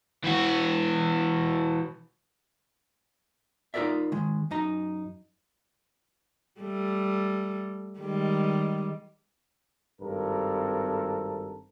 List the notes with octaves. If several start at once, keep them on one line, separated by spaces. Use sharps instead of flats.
E3 F#4
D#4 F4 G4 A#4 D5 E5
D#3 G#3
F#2 D#4 A#5
G3 A3
D#3 G3 G#3
G#1 G2 C4 A4 A#4